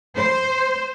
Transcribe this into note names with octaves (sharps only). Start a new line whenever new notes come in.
C5